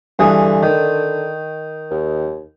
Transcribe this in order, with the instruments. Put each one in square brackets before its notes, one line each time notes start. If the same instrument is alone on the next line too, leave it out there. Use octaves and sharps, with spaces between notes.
[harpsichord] G2 E3 G#4 [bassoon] D3
[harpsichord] D#3
[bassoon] D#2